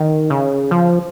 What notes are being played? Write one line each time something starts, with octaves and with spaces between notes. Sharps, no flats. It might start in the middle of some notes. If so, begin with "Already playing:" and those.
Already playing: D#3
C#3
F3